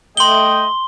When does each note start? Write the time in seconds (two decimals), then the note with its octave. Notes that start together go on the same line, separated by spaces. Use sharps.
0.17 A3 D#5 G5 C6 G7